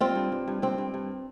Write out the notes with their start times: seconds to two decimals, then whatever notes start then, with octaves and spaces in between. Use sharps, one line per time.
0.01 G3 C4 F4
0.15 G2
0.32 G2
0.48 G2
0.62 G2 C4
0.78 G2
0.94 G2